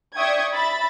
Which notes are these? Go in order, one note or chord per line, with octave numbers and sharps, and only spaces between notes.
D5 E5 G5 C#6 D#6 G#6
E5 B5 A6